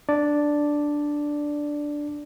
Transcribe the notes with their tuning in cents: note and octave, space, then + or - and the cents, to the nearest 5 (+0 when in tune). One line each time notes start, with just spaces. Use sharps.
D4 +0 D5 +0